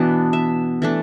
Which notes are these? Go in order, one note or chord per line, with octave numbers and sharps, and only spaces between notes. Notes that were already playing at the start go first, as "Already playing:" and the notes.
Already playing: B2 E3 B3 D4 A5
E5
E3 A3 D4